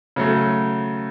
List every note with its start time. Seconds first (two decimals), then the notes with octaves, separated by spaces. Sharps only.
0.16 C#3 F#3 A3